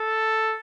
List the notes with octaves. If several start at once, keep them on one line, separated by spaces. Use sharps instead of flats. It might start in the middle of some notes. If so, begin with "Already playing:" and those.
Already playing: A4